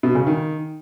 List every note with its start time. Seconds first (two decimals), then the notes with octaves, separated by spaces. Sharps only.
0.03 B2
0.15 C#3
0.27 D#3